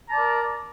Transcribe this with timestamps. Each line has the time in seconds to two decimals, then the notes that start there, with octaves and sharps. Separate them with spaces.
0.07 A#5
0.11 A5
0.14 D5
0.18 A#4